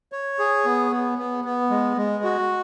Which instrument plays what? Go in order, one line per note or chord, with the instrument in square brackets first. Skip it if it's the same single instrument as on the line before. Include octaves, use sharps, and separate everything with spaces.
[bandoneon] C#5
G#4
B3
B3
B3
B3
G#3
G#3
F#4